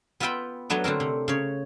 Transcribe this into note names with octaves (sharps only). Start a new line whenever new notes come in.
B3 F4 B4 E5 G5 B5
F#3 A3 B3 D4
D3 A3 C4 A#4
C3
C#3 C#5